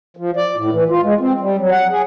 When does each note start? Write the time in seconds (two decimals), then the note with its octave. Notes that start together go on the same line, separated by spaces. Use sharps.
0.17 F3
0.36 D5
0.57 A2
0.72 E3
0.90 F4
1.03 G#3
1.21 C4
1.40 G3
1.59 F#3
1.72 F#5
1.91 G#4